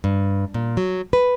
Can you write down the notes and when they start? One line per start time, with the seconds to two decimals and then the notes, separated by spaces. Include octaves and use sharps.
0.04 G2
0.54 A#2
0.77 F#3
1.13 B4